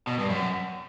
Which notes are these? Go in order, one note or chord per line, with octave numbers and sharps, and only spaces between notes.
B2
G2
F#2